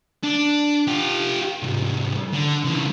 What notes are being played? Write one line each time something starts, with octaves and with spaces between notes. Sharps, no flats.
D4
F4 G4
C2 G#2
D3
C#3 E3